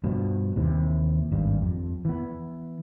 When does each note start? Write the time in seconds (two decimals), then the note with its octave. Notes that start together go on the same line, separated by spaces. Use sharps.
0.04 G2 B2 F3
0.56 D#2 C3 E3
1.32 G#1 G2
1.62 F2
2.05 E3 B3